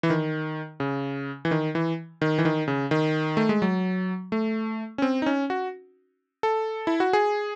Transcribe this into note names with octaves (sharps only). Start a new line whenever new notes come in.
E3
D#3
C#3
E3
D#3
E3
D#3
E3
D#3
C#3
D#3
A3
G#3
F#3
A3
C#4
C4
D#4
C#4
F#4
A4
E4
F#4
G#4